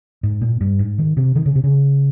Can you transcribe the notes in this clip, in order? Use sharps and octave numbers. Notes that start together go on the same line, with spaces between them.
G#2
A#2
G2
G#2
D#3
C3
D#3
C#3
C3
C#3